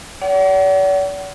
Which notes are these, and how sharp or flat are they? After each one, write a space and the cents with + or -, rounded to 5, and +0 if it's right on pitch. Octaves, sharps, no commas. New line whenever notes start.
D5 -45 F#5 +35